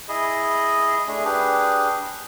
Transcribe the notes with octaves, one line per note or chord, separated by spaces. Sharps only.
E4 G#4 D#5
A3 D4 G#4
D4 G4 G#4 B4